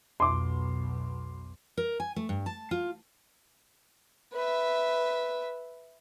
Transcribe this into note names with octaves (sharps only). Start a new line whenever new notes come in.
B1 F2 B2 C6 D6
A#4
G#5
A3
G2
A5
F4
B4 E5